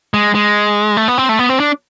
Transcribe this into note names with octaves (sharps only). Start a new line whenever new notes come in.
G#3
G#3
A3
B3
C4
A3
B3
C4
D4